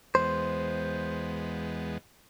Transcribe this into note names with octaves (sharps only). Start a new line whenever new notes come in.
E2 G#3 B3 C5